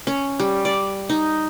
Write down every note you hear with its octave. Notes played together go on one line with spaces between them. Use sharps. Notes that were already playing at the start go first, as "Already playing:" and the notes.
C#4
G3
D5
D#4